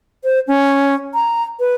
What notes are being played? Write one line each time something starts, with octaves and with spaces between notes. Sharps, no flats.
C5
C#4
A#5
B4